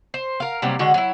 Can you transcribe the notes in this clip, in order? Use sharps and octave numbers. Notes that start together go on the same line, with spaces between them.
C5
A#4 F5
C3 F#3 G3 A#3
D3 G#3 F#4
F#3 E4